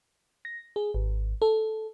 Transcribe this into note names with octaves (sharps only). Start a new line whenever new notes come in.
A#6
G#4
G#1
A4